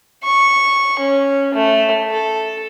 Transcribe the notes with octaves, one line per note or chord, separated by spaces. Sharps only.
C#6
C#4
A3
A4